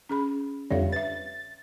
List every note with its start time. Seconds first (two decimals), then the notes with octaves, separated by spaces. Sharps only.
0.09 C#4 G#4 B5
0.71 F2 D3 G3 C#5 E5 F5
0.92 B4 E5 A6